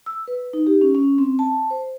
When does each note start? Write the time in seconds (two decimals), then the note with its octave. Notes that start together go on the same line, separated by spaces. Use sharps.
0.06 E6
0.28 B4
0.53 D#4
0.67 G4
0.81 C#4
0.95 C#4
1.18 C4
1.39 A5
1.71 C5